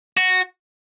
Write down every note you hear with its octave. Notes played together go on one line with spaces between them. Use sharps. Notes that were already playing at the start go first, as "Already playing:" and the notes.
F#4